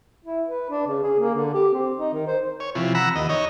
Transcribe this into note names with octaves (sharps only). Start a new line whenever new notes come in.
E4
B4
D4
C#3
G#4
A#3
D3
G4
C4
D#4
D#3
C5
C#5
C3 E3 F3
F#5 A#5 B5 E6
D#2 D#5
D#4 C#5 D#5